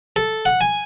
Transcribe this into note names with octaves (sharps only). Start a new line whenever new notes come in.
A4
F#5
G#5